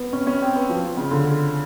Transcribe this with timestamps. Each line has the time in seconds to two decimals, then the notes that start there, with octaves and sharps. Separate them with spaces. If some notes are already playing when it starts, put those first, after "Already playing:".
Already playing: B3
0.13 C#4
0.27 C#4
0.42 C4
0.56 B3
0.69 F3
0.97 C#3
1.11 D3